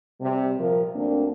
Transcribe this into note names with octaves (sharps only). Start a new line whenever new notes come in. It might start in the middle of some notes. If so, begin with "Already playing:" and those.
C3 G3
A#2 F3 A#4
D2 A#3 C4 D4